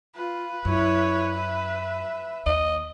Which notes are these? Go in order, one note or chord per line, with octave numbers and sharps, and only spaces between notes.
F4 B4
F#2 E4 C#5
E5
D#2 D#5